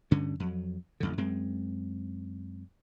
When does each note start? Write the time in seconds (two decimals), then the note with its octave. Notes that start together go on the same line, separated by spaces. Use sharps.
0.11 D2 G2 D3 C#4
0.40 F2 F#3
1.00 A1 F2 D3
1.18 F#2 G#3 C4